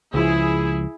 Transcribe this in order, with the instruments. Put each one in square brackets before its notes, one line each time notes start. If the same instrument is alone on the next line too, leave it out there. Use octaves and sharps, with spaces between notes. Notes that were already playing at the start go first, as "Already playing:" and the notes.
[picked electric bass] C#2 F3 [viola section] E4 G#4